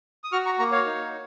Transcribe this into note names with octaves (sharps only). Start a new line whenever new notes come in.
D#6
F#4 C#6 F6
A#5 C#6
A#3 A#5 C#6
C#5 F5
D#4